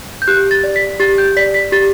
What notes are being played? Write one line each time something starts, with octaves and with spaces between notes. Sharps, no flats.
G6
G4 F#6
A6
D5
B6
G4 A6
G6
D5 B6
B6
G4 A6